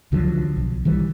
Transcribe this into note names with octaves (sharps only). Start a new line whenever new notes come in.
C#2 D3 F3 F#3
B1
D#3 E3 G3